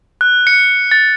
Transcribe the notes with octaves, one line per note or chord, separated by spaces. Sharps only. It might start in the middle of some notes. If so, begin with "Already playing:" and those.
F#6
C#7
A6